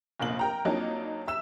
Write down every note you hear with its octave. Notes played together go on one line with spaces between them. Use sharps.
F1 A#1 A#3 F#7
A#4 G5 A#5
F2 F#3 A#3 D4 D#4
E5 E6 E7